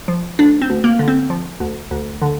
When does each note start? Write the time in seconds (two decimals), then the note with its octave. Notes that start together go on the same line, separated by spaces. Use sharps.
0.08 F3
0.39 D2 D4
0.62 C4
0.70 D2
0.84 A#3
0.99 D3
1.08 C4
1.30 F3
1.60 D2
1.91 D2
2.22 D3